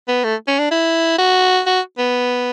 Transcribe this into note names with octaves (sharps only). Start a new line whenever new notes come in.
B3
A3
C#4
D4
E4
F#4
F#4
B3